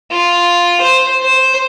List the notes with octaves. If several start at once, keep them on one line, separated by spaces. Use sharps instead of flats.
F4
C5
C5